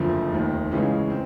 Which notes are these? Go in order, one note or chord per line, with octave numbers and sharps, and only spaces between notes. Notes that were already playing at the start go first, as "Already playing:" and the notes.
Already playing: F#1 F2 D3 F3 A3
F1 D#2 D#3
C#2 C#3 E3 G#3 C#4
C4